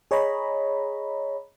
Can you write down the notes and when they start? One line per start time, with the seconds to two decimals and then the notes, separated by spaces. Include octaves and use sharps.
0.11 G#4 C#5 D#5 A#5 B5